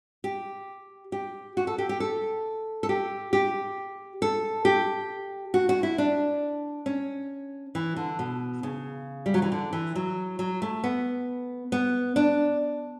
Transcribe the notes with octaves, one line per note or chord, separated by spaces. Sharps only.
G4
G4
F#4
A4
G4
G4
A4
A4
G4
G4
A4
G4
F#4
F#4
E4
D4
C#4
E3
D3
B2
C#3
G3
F#3
E3
D3
E3
F#3
F#3
A3
B3
B3
D4